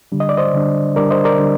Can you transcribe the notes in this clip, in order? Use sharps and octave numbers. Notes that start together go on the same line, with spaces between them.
D3 G3 D4
D#5
D5
C5 D#5
D3 G3 D4
D3 G3 D4 A#4 D5
C5 D#5
A#4 D5
D3 G3 D4